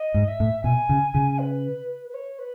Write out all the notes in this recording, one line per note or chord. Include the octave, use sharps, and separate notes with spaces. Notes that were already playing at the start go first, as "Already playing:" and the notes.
Already playing: D#5
G#2
E5
A2
B2 G#5
C#3
C#3
B4
B4
C#5
B4